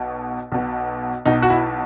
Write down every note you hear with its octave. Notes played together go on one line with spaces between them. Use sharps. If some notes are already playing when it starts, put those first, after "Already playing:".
Already playing: B1 B2
B1 B2
B1 B2 D#4
F#4
E4